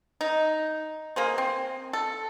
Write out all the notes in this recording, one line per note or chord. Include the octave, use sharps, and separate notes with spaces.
D#4
A#3 G#4 C5
C4
A4